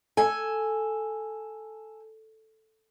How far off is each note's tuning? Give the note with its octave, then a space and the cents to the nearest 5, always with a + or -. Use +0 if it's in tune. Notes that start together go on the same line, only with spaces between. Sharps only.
A4 +0 G#5 +0